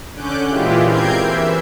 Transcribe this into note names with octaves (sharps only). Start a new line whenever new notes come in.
D3 C#4 D6 F#6 G6
A#2 E3 G#3 E4 F4 G4
C4 A#4 G6 G#6 C7 D7
E3 E5